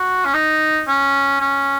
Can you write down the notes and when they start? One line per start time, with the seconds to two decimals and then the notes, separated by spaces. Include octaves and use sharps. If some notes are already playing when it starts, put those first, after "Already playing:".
Already playing: F#4
0.25 C#4
0.34 D#4
0.88 C#4
1.40 C#4